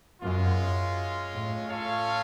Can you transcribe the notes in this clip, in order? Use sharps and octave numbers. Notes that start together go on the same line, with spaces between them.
F#2 G#3 C#4 F4
A2
C#4 F4 A4 C#5 F5